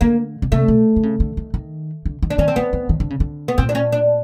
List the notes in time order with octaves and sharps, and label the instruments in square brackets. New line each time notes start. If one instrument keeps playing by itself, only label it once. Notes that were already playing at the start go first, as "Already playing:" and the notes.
[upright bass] D3 [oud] A#3
[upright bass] B2
[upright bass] C3 [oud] A3
[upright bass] B2
D3
C#3
D3
D#3
D#3
D3
D#3
[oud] D4
[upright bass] D#3 [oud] C#4
[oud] C4
[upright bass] E3 [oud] B3
[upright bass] D#3
D#3
D3
C#3
D3
[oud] B3
[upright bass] A#2 [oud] C4
[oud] D4
C#4
D4